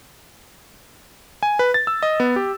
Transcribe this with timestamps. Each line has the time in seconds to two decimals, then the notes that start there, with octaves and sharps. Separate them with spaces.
1.43 G#5
1.59 B4
1.74 A6
1.87 E6
2.03 D#5
2.20 B3
2.36 G4